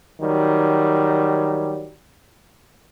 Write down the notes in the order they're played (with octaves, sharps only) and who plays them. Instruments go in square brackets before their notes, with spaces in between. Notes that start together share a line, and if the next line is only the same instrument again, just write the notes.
[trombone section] D#3 F#3 G3